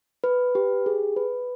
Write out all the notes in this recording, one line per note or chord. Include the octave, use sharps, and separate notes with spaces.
B4
G4
G#4
B4